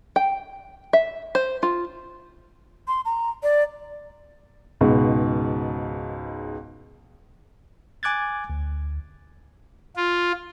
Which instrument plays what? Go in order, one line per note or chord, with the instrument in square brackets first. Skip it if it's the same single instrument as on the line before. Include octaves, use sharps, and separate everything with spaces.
[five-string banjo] G5
E5
C5
F4
[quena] C6
A#5
D5
[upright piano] C#2 G#2 B2
[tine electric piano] G#5 D6 F#6 G#6 A6
D2
[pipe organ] F4